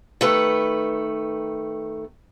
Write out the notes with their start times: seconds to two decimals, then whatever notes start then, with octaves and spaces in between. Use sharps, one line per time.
0.21 D#3 A3 B4